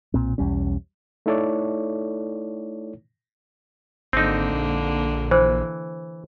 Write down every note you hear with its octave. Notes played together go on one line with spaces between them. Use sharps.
B1 A#2 C4
B1 E2 G3 C#4
A3 D#4 E4 A4 C#5 D5
G#1 D3 A#3 C4 D#4
A#1
E3 C5